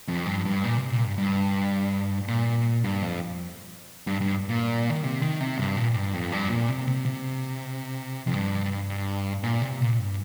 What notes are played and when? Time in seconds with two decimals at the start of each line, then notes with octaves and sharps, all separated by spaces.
0.08 F2
0.26 G2
0.45 G2
0.64 A#2
0.77 C3
0.91 A#2
1.04 G2
1.18 G2
2.28 A#2
2.84 G2
3.02 F2
4.07 G2
4.21 G2
4.49 A#2
4.90 D#3
5.04 C3
5.22 D#3
5.40 C3
5.58 G2
5.77 A#2
5.96 G2
6.13 F2
6.32 G2
6.50 A#2
6.69 C3
6.87 C3
7.05 C3
8.27 F2
8.34 G2
9.43 A#2
9.62 C3
9.80 A#2
9.99 G2